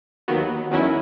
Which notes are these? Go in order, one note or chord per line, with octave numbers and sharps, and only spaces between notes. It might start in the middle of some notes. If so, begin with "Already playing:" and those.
D#2 D#3 F#3 B3
E2 D#3 F#3 C#4 E4